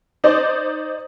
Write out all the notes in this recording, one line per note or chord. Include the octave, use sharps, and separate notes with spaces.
D#4 C5 D5 D#5 D6